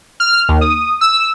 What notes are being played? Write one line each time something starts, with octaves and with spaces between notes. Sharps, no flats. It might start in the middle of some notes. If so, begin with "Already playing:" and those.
F6
D#2
D#6
E6